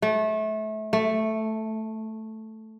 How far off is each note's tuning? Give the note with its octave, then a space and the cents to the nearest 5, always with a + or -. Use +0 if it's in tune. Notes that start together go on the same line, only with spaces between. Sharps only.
A3 -25
A3 +0